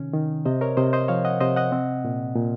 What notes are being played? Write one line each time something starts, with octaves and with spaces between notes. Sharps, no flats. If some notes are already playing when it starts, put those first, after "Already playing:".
Already playing: C3 D#3 C#4
D#3
C3 C5 D#5
A#4 C#5
C3 C5 D#5
C5 D#5
F3 C#5 F5
D#5 F#5
C3 C5 D#5
D#5 F#5
C4
A#2
A#2